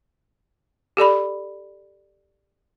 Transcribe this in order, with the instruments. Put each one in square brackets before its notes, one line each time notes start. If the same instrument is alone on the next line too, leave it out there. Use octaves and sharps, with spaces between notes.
[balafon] G4 A4 D5 B5